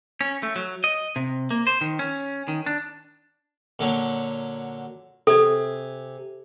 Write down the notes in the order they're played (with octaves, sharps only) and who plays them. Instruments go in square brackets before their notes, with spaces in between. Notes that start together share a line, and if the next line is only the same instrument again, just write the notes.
[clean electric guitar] C#4
A3
F#3
D#5
C3
A#3
C5
D#3
C#4
D#3
D4
[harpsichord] A#2 D3 F#3
[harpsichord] C3 G#5 [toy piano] A4